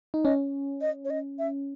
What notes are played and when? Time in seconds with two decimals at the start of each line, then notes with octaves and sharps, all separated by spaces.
0.14 D#4
0.24 C#4 D#5
0.81 D#5
1.05 C#5
1.10 D#5
1.39 E5